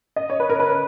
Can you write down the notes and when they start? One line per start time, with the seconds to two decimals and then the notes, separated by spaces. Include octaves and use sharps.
0.16 D#5
0.30 C#5
0.40 B4
0.50 A#4
0.60 B4